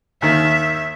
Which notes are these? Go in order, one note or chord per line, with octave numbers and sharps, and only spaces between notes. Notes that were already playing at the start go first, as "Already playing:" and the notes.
D#2 D#3 E5